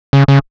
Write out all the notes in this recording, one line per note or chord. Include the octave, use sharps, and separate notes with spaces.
C#3
C#3